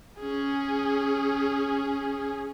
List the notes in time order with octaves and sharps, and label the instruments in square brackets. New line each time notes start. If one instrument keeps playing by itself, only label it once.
[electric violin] C#4 G#4